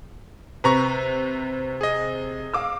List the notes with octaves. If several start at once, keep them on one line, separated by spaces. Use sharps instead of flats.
C3 B4 A#5 C#6
G#4 D#5
F5 D6 E6